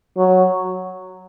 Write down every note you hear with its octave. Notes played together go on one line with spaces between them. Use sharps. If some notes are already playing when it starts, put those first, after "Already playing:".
F#3